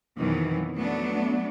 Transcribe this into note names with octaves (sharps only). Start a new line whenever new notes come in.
F2 B2 D#3 E3 F#3
F#3 A3 B3 D4